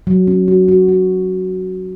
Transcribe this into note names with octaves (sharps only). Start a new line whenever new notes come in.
F#3
C#4
F#4
F#4
F#4